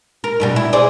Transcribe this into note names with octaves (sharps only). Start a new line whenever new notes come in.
A#4
G2 B2 G3
E4
G#4 C5 D5